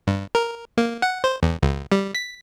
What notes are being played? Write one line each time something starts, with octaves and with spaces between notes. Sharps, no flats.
G2
A#4
A#3
F#5
C5
E2
C#2
G3
B6